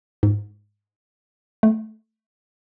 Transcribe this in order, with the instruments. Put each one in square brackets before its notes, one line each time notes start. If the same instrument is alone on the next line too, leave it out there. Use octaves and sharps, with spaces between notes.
[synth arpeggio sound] G#2
A3